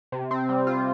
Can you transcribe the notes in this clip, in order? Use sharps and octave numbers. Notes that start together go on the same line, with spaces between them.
C3
C4
G3
F4